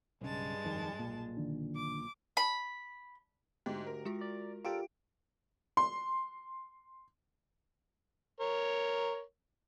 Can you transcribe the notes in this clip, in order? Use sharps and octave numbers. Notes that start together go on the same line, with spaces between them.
B1 G2 C#3 G#3 A5
F2 G#2 D#3
B1 A#2
D3 D#3 D4
D6
B5
D2 G#2 G4
A#4
G#3 F4 F#4
D5
F4 G4 A4 A#4 D5 D7
C6
A#4 C#5